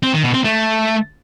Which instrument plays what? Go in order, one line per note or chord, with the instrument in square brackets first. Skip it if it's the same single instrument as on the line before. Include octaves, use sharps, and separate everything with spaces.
[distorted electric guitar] C4
D#3
B2
C4
A3